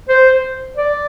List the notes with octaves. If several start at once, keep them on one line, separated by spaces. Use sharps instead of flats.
C5
D5